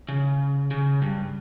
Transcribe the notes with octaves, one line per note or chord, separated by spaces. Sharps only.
C#3
C#3
G2